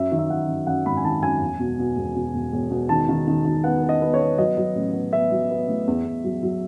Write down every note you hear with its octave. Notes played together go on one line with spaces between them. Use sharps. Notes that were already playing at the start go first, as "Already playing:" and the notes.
Already playing: F#2 E5
D#3
E5
F#2 F#5
F#2
F#2 F#5
G#1 B5
G#5
D#3 A5
F#2 G#5
E1
B2
B2
E1
B2
E1
E1
B2
D#3 A5
D#3
D#3
D#3
B3 F#5
B3
D#5
B3
C#5
B3
F#3 D#5
F#3
A1
B3
B3 E5
F#3
B3
A2
E2
E2
F#3
F#3